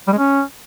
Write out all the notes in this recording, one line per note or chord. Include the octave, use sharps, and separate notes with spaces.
G3
G#3
C#4